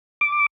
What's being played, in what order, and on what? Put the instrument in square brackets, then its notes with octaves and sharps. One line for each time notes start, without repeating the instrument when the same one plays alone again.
[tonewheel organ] D6